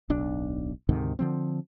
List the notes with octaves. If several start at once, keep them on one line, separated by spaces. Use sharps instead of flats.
D1 B1 D4
D2 G#2 C3 D#3
D3 F3 C4